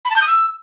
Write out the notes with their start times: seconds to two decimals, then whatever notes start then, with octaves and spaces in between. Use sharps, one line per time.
0.05 B5
0.10 A5
0.16 G6
0.22 D#6
0.27 E6